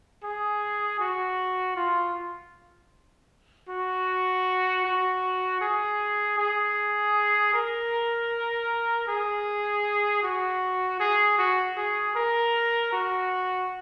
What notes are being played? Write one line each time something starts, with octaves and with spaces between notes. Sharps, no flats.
G#4
F#4
F4
F#4
F#4
G#4
G#4
A#4
G#4
F#4
G#4
F#4
G#4
A#4
F#4